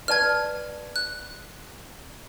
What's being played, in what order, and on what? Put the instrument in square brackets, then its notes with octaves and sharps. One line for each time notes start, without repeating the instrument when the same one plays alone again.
[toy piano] B4 D5 A5 [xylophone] F6 G#6
[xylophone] F#6